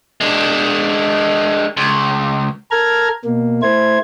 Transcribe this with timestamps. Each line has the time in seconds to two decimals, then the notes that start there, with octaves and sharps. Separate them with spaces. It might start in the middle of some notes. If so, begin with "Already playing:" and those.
0.21 G#3 D4
1.77 C#2
2.71 A4 A#4 A#5 F6 G#6
3.25 B2 A#3
3.62 A3 E4 C5 G#6